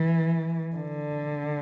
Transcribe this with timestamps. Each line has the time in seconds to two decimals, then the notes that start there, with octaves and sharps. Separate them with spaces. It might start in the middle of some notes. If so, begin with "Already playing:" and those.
Already playing: E3
0.76 D3